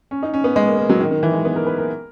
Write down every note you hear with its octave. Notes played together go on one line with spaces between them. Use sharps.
C#4
D#4
C#4
B3
G#3
A#3
A#3
F#3
D#3
D#3
E3
G#3
B3
A#4
B4
A#4